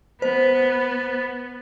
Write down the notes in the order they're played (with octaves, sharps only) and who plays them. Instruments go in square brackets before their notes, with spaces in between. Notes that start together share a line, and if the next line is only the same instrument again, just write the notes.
[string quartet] B3 [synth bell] C5